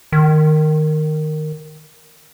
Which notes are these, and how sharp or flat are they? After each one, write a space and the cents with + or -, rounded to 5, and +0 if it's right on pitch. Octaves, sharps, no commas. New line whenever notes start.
D#3 -10